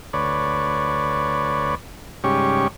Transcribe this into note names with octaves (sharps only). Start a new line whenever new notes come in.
D2 B4 C#5 D5
G#2 C#3 G3 C#4 G4 C#6